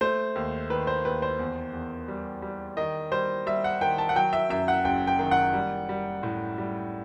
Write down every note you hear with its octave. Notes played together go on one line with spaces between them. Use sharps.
A3 C5
D#2
D#3 B4
C5
D#2 B4
C5
E2
E2
G3
G3
D#3 D#5
G3 C5
G3 E5
F#5
D#3 G5
A5
F#5
F#3 G5
E5
F#2 E5
F#5
F#1 G5
G5
D#3
F#5
G3
G3
A2
G3